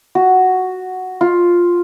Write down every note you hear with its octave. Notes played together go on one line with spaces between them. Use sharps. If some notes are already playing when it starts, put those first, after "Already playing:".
F#4
F4